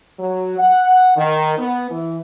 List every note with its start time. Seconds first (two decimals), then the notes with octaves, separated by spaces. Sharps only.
0.19 F#3
0.58 F#5
1.16 D#3
1.58 B3
1.90 E3